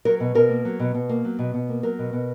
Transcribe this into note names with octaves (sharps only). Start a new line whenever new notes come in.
F#3 A#4
B2
B2 A#4
A#3
F#3
B2
B2
A#3
F#3
B2
B2
A#3
F#3 A#4
B2
B2